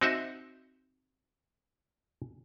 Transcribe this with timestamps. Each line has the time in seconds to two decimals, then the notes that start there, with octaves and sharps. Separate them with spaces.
0.01 C4 D#4 F#4 D#5 E5